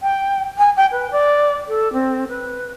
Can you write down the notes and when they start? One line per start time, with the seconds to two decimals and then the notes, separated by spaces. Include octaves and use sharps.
0.02 G5
0.58 G#5
0.76 G5
0.92 B4
1.11 D5
1.68 A4
1.93 C4
2.28 B4